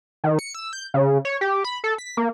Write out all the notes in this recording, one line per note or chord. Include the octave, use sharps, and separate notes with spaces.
D#3
C#7
E6
G6
C#3
C#5
G4
B5
A4
B6
A#3